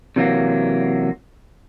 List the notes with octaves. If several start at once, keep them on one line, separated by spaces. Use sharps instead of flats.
C3 E3 F#3 A#3